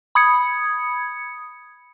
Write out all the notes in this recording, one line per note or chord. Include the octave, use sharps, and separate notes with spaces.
B5 D#6 G#6 C#7